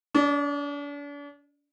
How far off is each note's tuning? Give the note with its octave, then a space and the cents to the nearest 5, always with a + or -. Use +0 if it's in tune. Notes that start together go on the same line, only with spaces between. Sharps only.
D4 -40 D5 +20